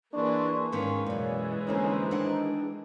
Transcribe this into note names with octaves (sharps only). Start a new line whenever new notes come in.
E3 A#3 D4 G#4 C6 C#6
G#2 D#3 A#3 B3 C#4
F#2 B2 E3 G#3 C#5 D5
F2 D3 A#3 C#4 C5 A#5
D#3 D4 F#5